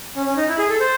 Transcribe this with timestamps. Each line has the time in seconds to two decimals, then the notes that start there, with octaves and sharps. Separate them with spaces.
0.15 C#4
0.26 C#4
0.37 D#4
0.49 E4
0.59 G#4
0.69 A4
0.80 C5